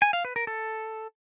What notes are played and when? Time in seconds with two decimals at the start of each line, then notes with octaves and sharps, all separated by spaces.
0.02 G#5
0.13 F5
0.25 B4
0.36 A#4
0.47 A4